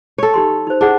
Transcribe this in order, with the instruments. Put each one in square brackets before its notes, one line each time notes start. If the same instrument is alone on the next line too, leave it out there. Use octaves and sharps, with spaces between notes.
[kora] A4 C#5
[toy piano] D#4 G4 C6
D#4 C5
[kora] D4 [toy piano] E4 G#4 F#5